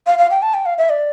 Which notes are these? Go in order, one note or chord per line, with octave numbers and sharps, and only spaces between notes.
F5
F5
G5
A5
G5
F5
E5
D5